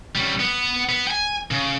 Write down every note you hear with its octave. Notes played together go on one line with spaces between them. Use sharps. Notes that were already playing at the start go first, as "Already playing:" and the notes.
G3 C#4
B3
B3
G5 G#5
C#3